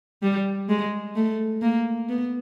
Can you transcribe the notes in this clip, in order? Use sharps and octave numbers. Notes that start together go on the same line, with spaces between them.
G3
G#3
A3
A#3
B3